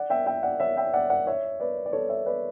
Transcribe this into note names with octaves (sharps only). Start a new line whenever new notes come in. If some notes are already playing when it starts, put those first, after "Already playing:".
Already playing: D5 F#5
E5 G5
E5 G5
D5 F#5
C#5 E5
E5 G5
D5 F#5
D5 F#5
C#5 E5
B4 D5
D5
A4 C#5
C#5 E5
B4 D5